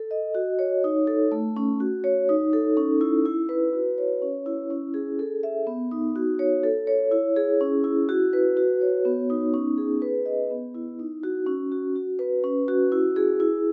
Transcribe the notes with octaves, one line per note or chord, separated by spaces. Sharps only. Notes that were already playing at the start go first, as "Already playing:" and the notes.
Already playing: A4
D#5
F#4
C#5
D#4
A4
A3
C#4
F#4
C#5
D#4
A4
C#4
E4
E4
B4
F#4
C#5
C#4
E4
C#4
G#4
A4
E5
B3
D#4
F#4
C#5
A4
C#5
E4
G#4
C#4
E4
F#4
B4
F#4
C#5
B3
D#4
C#4
G#4
B4
D#5
B3
E4
D#4
F#4
C#4
F#4
F#4
B4
C#4
F#4
E4
G#4
E4